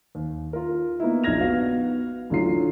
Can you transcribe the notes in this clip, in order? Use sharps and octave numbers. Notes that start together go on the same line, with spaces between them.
D#2
F4 A#4
A#3 B3 D#4 E4
A#1 D#4 F6 G#6 A#6 F7
B3 F#4 F5
A1 D3 F#3 F4 C7